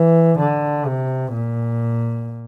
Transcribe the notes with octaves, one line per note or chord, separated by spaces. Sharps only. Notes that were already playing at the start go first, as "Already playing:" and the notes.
Already playing: E3
D3
C3
A#2